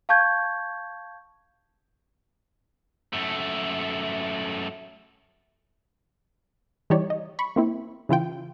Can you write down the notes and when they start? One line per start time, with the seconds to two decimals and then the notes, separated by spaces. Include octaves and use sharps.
0.09 F5 A5 C#6 G6 G#6
3.13 F#2 A3
6.90 E3 G3 D#4 G4 C#5 D5
7.10 D#5
7.39 B5 C#6
7.56 A#3 C4 E4
8.09 C#3 E3 F4 G5